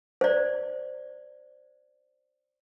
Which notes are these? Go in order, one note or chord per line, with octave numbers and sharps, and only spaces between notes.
C5 D5